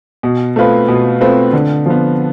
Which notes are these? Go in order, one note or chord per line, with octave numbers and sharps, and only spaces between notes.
B2
A3 C4 F4 B4
B2
A3 C4 F4 B4
D3
F3 B3